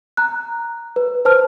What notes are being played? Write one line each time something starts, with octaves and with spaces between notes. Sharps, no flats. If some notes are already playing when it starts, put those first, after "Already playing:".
A#5 F#6
B4
B4 C5 A5 F6